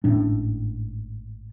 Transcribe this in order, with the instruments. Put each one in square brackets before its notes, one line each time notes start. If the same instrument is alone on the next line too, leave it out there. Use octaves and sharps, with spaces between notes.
[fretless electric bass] G#1 A2 C#4 D4